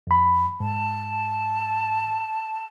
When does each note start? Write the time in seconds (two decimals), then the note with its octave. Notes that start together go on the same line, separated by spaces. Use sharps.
0.07 F2 B5
0.60 G#2 A5